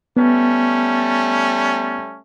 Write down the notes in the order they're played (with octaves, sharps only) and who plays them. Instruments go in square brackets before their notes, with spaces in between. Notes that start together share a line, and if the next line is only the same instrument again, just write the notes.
[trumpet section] G3 A3 C#4 [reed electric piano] B3